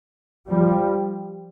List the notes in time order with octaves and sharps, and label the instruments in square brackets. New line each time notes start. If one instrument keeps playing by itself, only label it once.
[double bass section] F3 G3